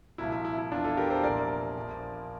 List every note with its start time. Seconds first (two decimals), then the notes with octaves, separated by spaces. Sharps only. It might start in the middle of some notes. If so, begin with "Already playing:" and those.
0.18 C2 A#2 F3 E4
0.32 E4
0.45 E4
0.58 E4
0.71 E1 E2 E3 D4 F4
0.84 F4 A4
0.97 G4 A#4
1.10 A4 C5
1.23 C2 A#2 F3 A#4 D5
1.76 A#1 A#2 F3